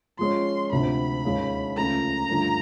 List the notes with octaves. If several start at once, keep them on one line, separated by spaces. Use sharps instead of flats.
F3 G#3 C#4 C6
D2 C3 F3 B5
D#2 D#3 G#3 C#4 F4
C#2 C#3 F3 A3 A#5
G2 D3 F3 A3 D4